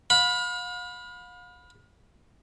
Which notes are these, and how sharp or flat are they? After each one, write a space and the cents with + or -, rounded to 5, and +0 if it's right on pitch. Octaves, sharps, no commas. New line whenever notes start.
F5 +40 B5 +0